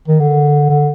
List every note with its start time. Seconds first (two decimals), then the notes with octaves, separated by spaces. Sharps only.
0.08 D#3
0.20 D3
0.70 D3